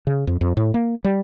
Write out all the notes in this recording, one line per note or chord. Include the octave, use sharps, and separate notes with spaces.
C#3
F2
F2
A2
A#3
G3